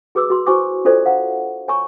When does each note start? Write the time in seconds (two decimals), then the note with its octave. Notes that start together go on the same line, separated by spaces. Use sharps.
0.15 F#4 G#4 B4 D6 E6
0.30 F#4 C6
0.46 E4 F#4 C5 G#5 C#6 D6
0.85 D4 F4 A4 C5 D5 D#5
1.05 C5 F5 F#5 A#5
1.68 C#5 G#5 A#5 C#6